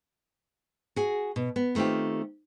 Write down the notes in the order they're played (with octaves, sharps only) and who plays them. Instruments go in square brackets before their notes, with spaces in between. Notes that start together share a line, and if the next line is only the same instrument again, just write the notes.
[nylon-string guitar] F#4 G#4
B2
B3
D#3 A3 C4 F4 G4